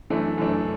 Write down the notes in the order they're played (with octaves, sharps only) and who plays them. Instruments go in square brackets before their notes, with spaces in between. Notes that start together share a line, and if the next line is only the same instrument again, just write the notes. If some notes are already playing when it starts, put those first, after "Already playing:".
[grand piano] F#2 E3 A3 D4
F#2 E3 A3 D4